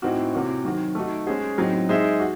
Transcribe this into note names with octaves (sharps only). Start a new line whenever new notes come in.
A2 E3 C4 D#4 F#4
C3 E3 C4 F#4 C#5
D#3 F#3 C4 F#4
A3 D#4 F#4
G#3 C#4 G#4 C5
A2 F#3 C4 D#4
G#3 D#4 G#4 C5 E5
F#4